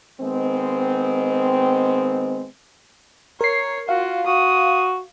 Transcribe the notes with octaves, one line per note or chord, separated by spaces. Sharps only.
D#3 G#3 B3 C4
A#4 C#5 C7
F4 F#4 F5
F#4 D#6